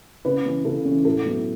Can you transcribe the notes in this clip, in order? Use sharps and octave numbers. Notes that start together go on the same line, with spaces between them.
C#3 B4
E3 C#4
C#3 A4
E3 C#4
A2 A4
F#3 B3 E4